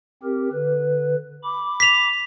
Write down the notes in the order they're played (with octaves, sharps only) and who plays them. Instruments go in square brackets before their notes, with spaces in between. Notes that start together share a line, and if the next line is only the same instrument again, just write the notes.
[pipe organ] C4 G4 A#4
D3 B4
B5 D6
[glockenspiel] B6 F7